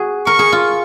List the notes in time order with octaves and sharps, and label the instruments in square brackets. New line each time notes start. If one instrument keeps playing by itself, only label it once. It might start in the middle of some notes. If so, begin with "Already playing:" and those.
Already playing: [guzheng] F#4 G#4
[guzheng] A#4 [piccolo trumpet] C#6
[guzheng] G#4
F4